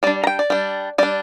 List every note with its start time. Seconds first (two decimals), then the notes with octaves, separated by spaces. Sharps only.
0.03 G3 D4 D5
0.24 A#5
0.27 G5
0.39 D5
0.50 G3 D4
0.98 G3 D4 D5